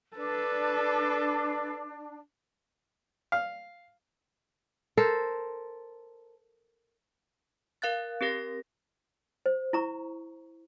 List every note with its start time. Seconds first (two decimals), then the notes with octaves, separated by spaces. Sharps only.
0.16 D4 A4 B4
3.32 F5
4.97 A4 A#4 C5
7.82 A#4 F5 F#6 A6
8.21 C4 G4 A#4 A#6
9.46 C5
9.73 E4 A#5 C#6